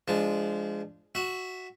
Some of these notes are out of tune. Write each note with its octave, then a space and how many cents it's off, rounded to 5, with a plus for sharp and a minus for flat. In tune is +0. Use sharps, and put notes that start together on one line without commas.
F3 -25 G#3 +0 D4 +0
F#4 +0 E5 +0